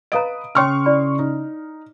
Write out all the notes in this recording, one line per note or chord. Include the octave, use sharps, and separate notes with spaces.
B4 D#5 F5 A#5 D#6 D7
C#3 C#5 G5 G#5 C6 C#6 F6
E4 D5 B5
D#4